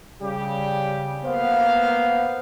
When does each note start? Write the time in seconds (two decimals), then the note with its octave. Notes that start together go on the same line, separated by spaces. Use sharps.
0.22 C#3 G3 G4
1.26 A#3 B3 C5 F5